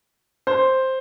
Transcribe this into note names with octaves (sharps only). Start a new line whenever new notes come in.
C5